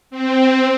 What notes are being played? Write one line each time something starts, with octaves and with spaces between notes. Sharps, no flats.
C4